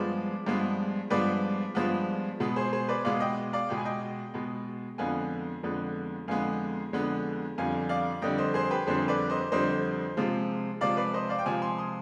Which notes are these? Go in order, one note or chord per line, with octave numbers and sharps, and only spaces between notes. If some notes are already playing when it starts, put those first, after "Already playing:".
Already playing: G2 F3 G#3 B3 B4 D5
G2 F3 G#3 B3
G2 F3 G#3 B3 B4 D5
G2 F3 G#3 B3
B2 G#3 B3
G#4 C5
G#4 C5
B4 D5
B2 G#3 B3 D5 F5
D#5 G5
D5 F5
B2 G#3 B3 G5
G#5
D#5 G5
B2 G#3 B3
F2 D3 G#3 B3 F5 G#5
F2 D3 G#3 B3
F2 D3 G#3 B3 F5 G#5
F2 D3 G#3 B3
F2 D3 G3 F5 G#5
D5 F5
F2 D3 G3 D#5 G5
C5 D#5
G#4 C5
G4 B4
F2 D3 G3 G#4 C5
B4 D5
C5 D#5
F2 D3 G3 C5 D#5
C3 F3 G#3
C3 F3 G#3 D5 F5
B4 D5
C5 D#5
D5 F5
G5
C3 F3 G#3 F5 G#5
G#5 C6
C6 D#6